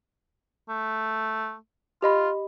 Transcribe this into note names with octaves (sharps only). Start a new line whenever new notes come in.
A3
F4 G4 D#5 B5